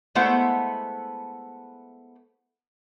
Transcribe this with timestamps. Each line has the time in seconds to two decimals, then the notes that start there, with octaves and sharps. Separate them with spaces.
0.15 G#3 A3 B3 E4 C5 F#5